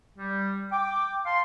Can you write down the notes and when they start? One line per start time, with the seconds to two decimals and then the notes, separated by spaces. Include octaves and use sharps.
0.18 G3
0.72 G5 D6
1.25 F5 A5 C6